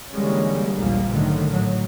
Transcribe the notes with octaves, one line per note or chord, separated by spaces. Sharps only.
D3 E3 G3 G#3 A#3 C#4
A#1 D#2 A#2 F3 G3 A#3
G#2 D3 D#3 F#3 A3
A2 F#3